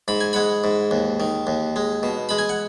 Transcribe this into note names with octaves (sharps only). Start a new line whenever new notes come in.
G#2 B5
G#5
G#3 F#5 B5
G#2
D#2
D#3
D#2
G#3
B2
G#3 B5
G#5
F#5